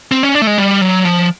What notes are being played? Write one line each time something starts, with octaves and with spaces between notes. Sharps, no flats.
C4
C#4
D4
A3
G#3
G3
F#3
F3